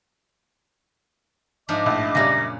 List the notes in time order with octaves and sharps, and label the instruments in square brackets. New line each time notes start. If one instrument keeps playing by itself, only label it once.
[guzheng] G#2 F3 D4 [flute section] D#5 E5 D6
[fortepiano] A#1 A2
[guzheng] F#2 A#2 C#4 [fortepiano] C#3 G3 [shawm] A#5